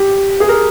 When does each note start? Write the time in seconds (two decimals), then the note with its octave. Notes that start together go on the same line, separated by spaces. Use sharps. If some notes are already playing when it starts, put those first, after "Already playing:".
Already playing: G4
0.40 G#4
0.49 A#4